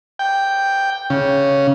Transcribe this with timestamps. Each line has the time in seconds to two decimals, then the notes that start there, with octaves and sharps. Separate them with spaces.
0.19 G5
1.10 C#3